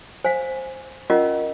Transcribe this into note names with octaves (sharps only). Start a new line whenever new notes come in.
C5 F5 G#5
C#4 F4 A#4 D#5 F#5